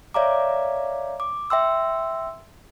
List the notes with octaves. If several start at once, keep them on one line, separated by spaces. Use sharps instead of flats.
C#5 D5 E5 F5 A#5 D6
D6
E5 G5 C6 E6